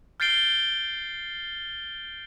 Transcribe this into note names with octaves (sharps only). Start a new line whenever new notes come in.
F6 G6 A6 C7 D7 G7